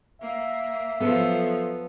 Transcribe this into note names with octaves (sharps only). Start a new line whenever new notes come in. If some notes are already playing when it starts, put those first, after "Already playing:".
A#3 E5
F3 F#3 B3 A4